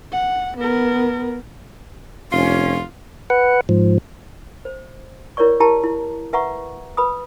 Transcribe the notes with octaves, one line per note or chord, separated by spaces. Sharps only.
F#5
B3 A#4
F1 C#4 F4
B4 F#5
G#2 F3
C5
E4 A#4 C#5 D5 C#6
E4 G4 A#4 A5 A#5
E4
B4 E5 F#5 A#5 C#6
B4 B5 D#6